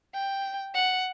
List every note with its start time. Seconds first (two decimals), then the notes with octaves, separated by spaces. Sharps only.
0.14 G5
0.75 F#5